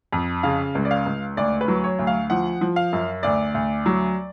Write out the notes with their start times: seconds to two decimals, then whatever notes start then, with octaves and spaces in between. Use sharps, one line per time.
0.13 F2
0.43 C#3 F5
0.75 C#2
0.85 D5
0.91 F5
1.06 C#2
1.37 D2 D5
1.61 B4
1.68 F#3
1.84 C#5
1.99 D2
2.07 F5
2.30 F3 F#5
2.61 F3
2.76 F5
2.93 F#2
3.23 D2 D5
3.54 D2
3.86 F#3